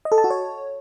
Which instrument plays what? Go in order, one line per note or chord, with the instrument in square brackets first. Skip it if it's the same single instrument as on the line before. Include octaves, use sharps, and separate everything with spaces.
[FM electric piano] D#5
A4
A5
F#4
C#5